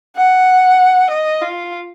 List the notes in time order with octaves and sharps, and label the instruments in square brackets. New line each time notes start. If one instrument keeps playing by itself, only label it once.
[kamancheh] F#5
D#5
F4